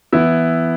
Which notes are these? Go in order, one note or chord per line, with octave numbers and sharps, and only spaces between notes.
E3 B3 E4